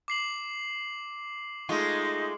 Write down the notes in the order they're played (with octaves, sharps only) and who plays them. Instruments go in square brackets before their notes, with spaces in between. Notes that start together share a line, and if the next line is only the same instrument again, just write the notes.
[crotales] D6 C7 F#7
[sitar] G#3 A3 F4 [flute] D#4